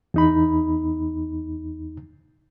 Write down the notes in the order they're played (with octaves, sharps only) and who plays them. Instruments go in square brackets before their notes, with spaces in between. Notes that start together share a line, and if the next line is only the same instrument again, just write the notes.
[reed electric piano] E2 D#4 B5